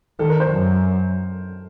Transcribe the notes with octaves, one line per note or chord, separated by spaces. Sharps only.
D#3 A4
A#4
C5
F#2